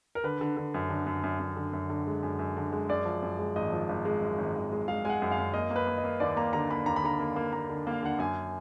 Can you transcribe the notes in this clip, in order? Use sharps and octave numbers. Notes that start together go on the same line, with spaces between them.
A#4
D3 B4
D3
D3
F#2
D3
F#2
F#2
F#2
D3
F#2
D3
G#3
F#2
F#2
D3
G#3
F#2 D5
F3
F#2
G#3
G#1 D#5
F3
G#1
G#3
F#2
G#1
G#1
G#3
G#3 F5
G#3 F#5 G#5
F#2
F5
F#2
A#3 D#5
A#3
B4
A#3
D#5
A#3
D#2 D5
A#3 A#5
D3 A#5
A#3 B5
D#2 A#5
B5
D3 A#5
A#3
A#3
A#3 A#5
D3
A#3 F5
D3 F#5
F#2 G#5